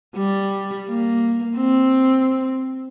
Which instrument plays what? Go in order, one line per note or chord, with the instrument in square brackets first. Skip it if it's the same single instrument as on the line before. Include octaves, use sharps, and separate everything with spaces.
[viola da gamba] G3
A#3
C4